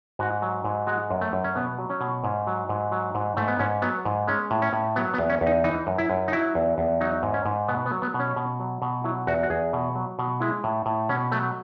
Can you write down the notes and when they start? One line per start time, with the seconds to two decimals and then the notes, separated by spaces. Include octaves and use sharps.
0.19 G#2 F#4
0.42 F#3
0.64 G#2
0.87 G#3 F#4
1.11 F#2
1.21 A3
1.33 F#2
1.44 C#4
1.55 B2 B3
1.79 F#3
1.90 C#4
2.01 B2
2.24 G#2
2.47 F#3
2.69 G#2
2.92 F#3
3.15 G#2
3.37 G#2 A3
3.48 B3
3.59 G#2 C#4
3.82 F#3 B3
4.05 G#2
4.28 G#3 C#4
4.51 A2
4.62 C#4
4.73 A2
4.96 F#3 B3
5.14 B3
5.18 E2
5.30 C#4
5.41 E2
5.47 D#4
5.64 E3 D#4
5.87 F#2
5.98 E4
6.10 F#2
6.28 D#4
6.32 F#3 E4
6.55 E2
6.78 E2
7.01 F#3 D#4
7.23 G#2
7.34 C#4
7.46 G#2
7.68 B2 B3
7.86 B3
7.91 F#3
8.02 B3
8.14 B2
8.19 C#4
8.36 B2
8.60 F#3
8.82 B2
9.04 F#3 E4
9.27 E2 F#4
9.43 F#4
9.50 E2 G#4
9.73 B2
9.95 F#3
10.19 B2
10.40 G#3 E4
10.64 A2
10.86 A2
11.09 B2 C#4
11.32 F#3 A3